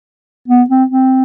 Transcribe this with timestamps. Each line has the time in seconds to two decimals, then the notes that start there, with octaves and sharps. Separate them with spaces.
0.48 B3
0.70 C4
0.90 C4